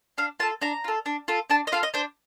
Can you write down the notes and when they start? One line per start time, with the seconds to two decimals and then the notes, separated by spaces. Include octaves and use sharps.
0.18 D4 F5
0.40 F4 A5
0.43 A4
0.62 D4 A#5
0.84 F4 A4
1.06 D4
1.28 F4 A4
1.50 D4 A5
1.67 D#5
1.72 F4 A4 F5
1.83 D#5
1.94 D4 C5